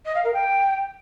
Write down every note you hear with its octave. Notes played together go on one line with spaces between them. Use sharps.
D#5
F5
A#4
G5